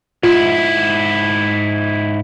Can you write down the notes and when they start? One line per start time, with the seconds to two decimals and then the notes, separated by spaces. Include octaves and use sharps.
0.23 G#2 E4 F4